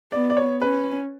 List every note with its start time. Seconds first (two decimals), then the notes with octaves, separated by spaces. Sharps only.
0.12 B3 D5
0.30 D5
0.37 C#5
0.61 C#4 B4